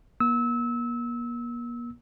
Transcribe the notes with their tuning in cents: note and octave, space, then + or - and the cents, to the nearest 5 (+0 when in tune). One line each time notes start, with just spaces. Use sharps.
A#3 +40 E6 -25